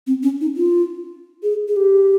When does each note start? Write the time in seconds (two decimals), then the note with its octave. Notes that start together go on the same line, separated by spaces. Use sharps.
0.07 C4
0.23 C#4
0.41 D#4
0.57 F4
1.43 G#4
1.68 G#4
1.77 G4